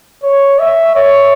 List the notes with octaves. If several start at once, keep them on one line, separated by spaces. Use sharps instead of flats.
C#5
E5
C#5